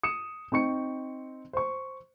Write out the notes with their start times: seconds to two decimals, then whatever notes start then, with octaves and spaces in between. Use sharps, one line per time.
0.03 D#6 C#7 E7
0.52 C4 D#4 C#6 C#7
1.53 C5 C#6